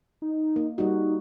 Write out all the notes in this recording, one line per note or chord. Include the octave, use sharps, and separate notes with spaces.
D#4
A#3
G3 D#4 F#4